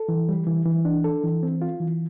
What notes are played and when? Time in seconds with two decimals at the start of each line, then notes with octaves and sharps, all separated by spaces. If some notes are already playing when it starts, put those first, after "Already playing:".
Already playing: A4
0.09 E3
0.29 G3
0.47 E3
0.66 E3
0.85 D4
1.04 A4
1.24 E3
1.43 C4
1.62 F4
1.80 E3